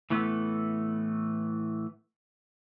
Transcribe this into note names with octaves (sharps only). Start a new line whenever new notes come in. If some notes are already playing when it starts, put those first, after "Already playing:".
A2 E3 A3 B3